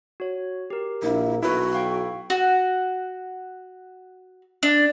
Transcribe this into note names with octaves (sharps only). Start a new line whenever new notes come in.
F#4 C#5
G4 A#4
A#1 A#3 E4
B1 E4 F#4 B4
F5 G5 C#6
F#4
D4